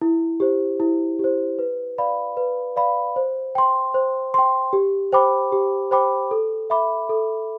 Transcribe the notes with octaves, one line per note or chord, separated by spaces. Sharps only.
E4
G4 C5
E4
G4 C5
B4
D5 F5 B5
B4
D5 F5 B5
C5
G5 C6
C5
G5 C6
G4
C5 G5 B5 D6
G4
C5 G5 B5 D6
A4
E5 B5 D6
A4